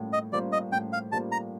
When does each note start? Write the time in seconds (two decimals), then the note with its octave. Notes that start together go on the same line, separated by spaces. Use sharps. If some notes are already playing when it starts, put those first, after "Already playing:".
Already playing: A2 G3 A#3 F4
0.13 D#5
0.33 G3 A#3 F4 C5 D5
0.52 D#5
0.72 A2 G5
0.93 F5
1.12 G3 A#3 F4 C5 A5
1.32 A#5